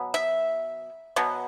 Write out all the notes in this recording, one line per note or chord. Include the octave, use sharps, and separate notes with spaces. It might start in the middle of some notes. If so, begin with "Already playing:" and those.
Already playing: B2 F#3 B3
E5
B2 F#3 B3